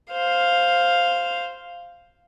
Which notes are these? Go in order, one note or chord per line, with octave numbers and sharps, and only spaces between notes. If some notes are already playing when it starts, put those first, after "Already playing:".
C5 F5